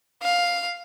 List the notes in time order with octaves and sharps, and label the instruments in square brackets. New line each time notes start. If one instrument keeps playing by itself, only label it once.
[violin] F5